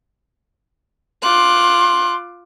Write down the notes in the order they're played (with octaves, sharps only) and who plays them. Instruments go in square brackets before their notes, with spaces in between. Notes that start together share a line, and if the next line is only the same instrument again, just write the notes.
[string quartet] F4 D6 F#6 [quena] C6